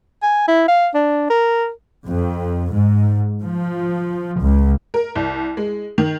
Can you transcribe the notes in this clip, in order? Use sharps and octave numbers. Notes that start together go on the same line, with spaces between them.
G#5
E4
F5
D4
A#4
F2
G#2
F3
C#2
A#4
C2
G#3
D#3